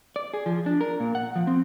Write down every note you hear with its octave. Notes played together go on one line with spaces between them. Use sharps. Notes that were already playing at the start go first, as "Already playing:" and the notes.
D5
G#4
F3
D4
A#4
A#2
F#5
F3
C4